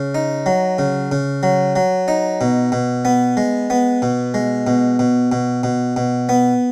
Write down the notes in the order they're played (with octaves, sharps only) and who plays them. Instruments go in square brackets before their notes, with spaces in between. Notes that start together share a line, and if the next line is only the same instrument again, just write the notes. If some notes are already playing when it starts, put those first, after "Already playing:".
Already playing: [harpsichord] C#3
D#4
F#3
C#3
C#3
F#3
F#3
D#4
B2
B2
B3
G#3
B3
B2
G#3
B2
B2
B2
B2
B2
B3